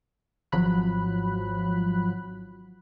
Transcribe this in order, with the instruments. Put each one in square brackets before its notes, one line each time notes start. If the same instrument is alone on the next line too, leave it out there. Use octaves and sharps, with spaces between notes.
[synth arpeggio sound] G#1 F3 F#3 B5 F#6